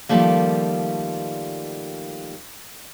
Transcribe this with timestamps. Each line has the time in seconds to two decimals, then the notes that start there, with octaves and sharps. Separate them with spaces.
0.09 D#3 F3 G3 A3 A#3